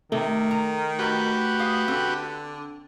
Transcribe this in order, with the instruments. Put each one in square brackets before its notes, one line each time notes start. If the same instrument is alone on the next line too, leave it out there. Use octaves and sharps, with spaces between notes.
[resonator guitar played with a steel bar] C3 [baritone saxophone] D#3 [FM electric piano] A3
[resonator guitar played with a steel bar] A#5
[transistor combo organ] F#4 G4 B4
[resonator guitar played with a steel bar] G#4 F5
[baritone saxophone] D3 [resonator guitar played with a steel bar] C4